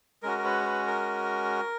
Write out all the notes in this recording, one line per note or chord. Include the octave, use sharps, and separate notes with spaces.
G#3 C#4 F#4 A#4
A#4
B4
B4
A#4